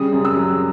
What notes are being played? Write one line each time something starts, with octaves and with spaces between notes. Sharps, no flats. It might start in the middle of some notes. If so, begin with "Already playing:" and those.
Already playing: C#3 G3 D#6
F#2
E6
F#3